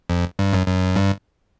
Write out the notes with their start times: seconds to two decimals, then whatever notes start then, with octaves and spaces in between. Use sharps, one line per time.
0.10 F2
0.39 G2
0.53 F#2
0.67 F#2
0.96 G2